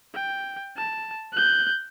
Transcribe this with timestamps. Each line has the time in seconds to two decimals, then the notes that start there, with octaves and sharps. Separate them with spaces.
0.14 G5
0.77 A5
1.33 F#6 G6